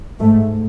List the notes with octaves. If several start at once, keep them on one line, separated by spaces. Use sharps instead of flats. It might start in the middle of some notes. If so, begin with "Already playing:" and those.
G#2 A3